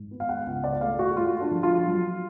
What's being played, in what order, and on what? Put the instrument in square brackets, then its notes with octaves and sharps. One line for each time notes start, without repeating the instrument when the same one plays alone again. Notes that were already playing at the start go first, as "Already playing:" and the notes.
Already playing: [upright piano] G#2
B3
F5
F#5
C#2
D5
A3 F5
F#4
F#4
A3 F4
D4
F3
F4
F#3